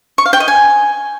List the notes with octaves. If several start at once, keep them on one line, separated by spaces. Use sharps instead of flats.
C#6
F5
G5
D#5
G#5